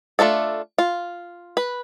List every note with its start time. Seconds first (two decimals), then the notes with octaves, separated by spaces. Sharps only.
0.19 A3 D4 F4 A4
0.78 F4
1.57 B4